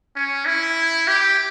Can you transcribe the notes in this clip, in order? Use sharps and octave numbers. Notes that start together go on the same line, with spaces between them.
C#4
E4
G4